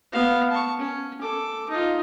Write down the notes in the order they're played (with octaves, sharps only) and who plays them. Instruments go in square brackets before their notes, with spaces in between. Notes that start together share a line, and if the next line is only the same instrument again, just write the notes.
[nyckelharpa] B3 F5
A5 C#6
C#4
A4 D6
D#4 F4